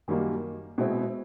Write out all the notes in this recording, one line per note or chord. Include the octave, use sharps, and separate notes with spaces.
F#2 D#3 G3 A#3 D#4
B2 G#3 C4 E4